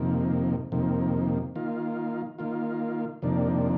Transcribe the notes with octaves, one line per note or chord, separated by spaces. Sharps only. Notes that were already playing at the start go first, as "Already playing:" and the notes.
Already playing: F2 C3 D#3 A#3
F2 C3 D#3 A#3
D#3 A#3 F4
D#3 A#3 F4
F2 C3 D#3 A#3 D4